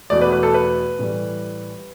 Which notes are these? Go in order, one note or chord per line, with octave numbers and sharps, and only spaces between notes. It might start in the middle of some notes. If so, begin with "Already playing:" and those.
E2 B2 A3 D5
B4
B4
A4
B4
A2 E3 G3